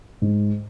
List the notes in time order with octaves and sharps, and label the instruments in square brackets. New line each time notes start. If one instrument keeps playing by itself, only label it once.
[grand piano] G#2